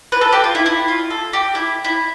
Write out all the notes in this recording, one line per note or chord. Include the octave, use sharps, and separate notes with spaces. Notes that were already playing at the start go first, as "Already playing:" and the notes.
B4
A4
G4
F4
E4
E4
F4
A4
G4
E4
E4